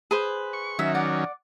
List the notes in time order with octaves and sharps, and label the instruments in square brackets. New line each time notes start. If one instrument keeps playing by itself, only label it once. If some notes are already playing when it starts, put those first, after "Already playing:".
[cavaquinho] G#4 B4 C5
[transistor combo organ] C#6
[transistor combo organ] D#3 F#3 C#4 [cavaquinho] E5
[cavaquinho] D5 F#5